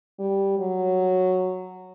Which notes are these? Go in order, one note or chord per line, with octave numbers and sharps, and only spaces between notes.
G3
F#3